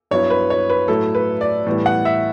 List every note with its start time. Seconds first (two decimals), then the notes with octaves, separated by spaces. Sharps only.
0.11 G2 F#3 B3 E4 C#5
0.30 B4
0.50 C#5
0.69 B4
0.88 A2 F#3 A3 E4 A4
1.15 B4
1.41 D5
1.66 A2 E3 G3 B3 E4
1.86 F#5
2.05 E5